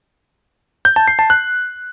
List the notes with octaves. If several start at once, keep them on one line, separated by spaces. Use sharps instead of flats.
G6
A5
C7
A5
F#6